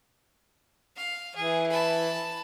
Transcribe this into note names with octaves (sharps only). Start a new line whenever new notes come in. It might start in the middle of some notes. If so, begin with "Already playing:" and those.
F5
E3 G#4
A5 B5